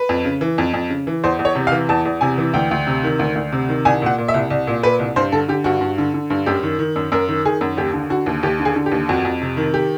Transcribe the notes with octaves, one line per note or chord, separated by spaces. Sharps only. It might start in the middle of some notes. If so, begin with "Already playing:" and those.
Already playing: B4
F2
C#3
E3
F2
F2
C#3
E3
E2 C5
E2
C#5
C3
F5
E3
E2 A5
E2
C3 G#5
E3
D2 G5
D2
C3
D#3
D2
D2
C3
D#3
C2 G#5
A#2 F#5
A#2
E5
C2
C2
A#2
A#2 B4
C2
G2 C5
D3 A4
D3 G4
G2 F#4
G2
D3
D3
G2
F#2 G4
D#3
D#3
F#2
F#2 A#4
D#3
D#3 G#4
F#2
D#2 G4
D3
D3 F#4
D#2
D#2 G4
D3
G#4
D3
G4
D#2
F2 F#4
F2
C3
D#3
G4